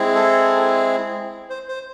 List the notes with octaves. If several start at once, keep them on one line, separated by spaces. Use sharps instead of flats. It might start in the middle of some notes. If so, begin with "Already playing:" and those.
Already playing: G#3 C4 E4 G#4
A4
C5
C5